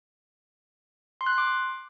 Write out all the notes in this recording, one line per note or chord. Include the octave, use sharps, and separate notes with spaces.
C6
F#6
C6
D6